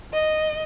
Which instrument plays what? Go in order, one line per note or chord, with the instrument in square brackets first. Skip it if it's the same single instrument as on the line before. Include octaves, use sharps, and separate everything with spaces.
[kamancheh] D#5